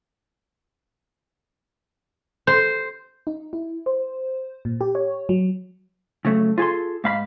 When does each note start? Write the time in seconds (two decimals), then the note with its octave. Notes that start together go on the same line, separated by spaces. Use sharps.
2.47 C5
3.27 D#4
3.53 E4
3.86 C5
4.65 A#2
4.81 G4
4.95 C#5
5.29 F#3
6.25 C#3 F#3 A3
6.58 F4 G#4 A4 C6
7.04 G#2 F5 B5